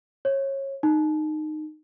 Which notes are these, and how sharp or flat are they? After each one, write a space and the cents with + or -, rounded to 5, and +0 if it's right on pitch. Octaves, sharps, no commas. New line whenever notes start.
C#5 -25
D#4 -15